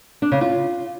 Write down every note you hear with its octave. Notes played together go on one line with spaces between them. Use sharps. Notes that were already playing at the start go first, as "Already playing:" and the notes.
D4
C#3
F4